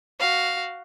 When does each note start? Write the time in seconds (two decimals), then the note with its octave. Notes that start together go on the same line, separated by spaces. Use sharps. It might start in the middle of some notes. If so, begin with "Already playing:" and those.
0.20 F#4 F5